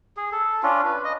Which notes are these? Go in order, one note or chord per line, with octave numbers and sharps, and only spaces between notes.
G#4
A4
C#4 D4 F4
B4
D#5